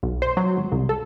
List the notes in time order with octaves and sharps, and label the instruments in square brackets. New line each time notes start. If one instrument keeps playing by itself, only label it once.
[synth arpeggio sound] B1
C5
F#3
G#1
C2
A4